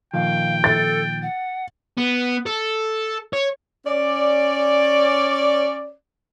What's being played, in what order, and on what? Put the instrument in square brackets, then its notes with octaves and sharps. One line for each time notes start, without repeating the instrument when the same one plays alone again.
[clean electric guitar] A#2 D#3 F3 [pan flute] F5 [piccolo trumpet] G5
[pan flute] A4 [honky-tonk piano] A6
[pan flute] F#5
[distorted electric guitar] B3
A4
C#5
[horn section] C#4 D5